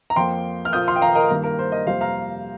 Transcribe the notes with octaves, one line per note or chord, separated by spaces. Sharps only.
A#5
F2 F3 A#3 G5 C6
F6
A#2 F3 A#3 D#6 G6
C6 F6
G5
F5 A#5
A#4 D#5
G2 D#3 A#3
A#4
C5
A#4 D#5
F2 C3 G3 A#3 C5 F5
F5 A#5